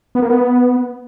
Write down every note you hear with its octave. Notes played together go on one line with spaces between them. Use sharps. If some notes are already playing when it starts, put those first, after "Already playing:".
B3
A#3
B3